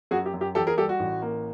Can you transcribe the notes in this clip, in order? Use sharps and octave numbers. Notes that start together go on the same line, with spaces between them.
F#2 F#4 G#4
G4
F#2
G4
E2 G4 A4
G#4 A#4
G3 G4 A4
F#4
A1
A#3